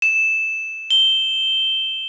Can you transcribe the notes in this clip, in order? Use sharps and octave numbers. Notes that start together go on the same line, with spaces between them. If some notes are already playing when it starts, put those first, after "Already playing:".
E7
G7